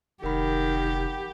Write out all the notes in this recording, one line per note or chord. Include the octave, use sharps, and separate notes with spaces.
F1 D#3 G4 A#4 F#5 B5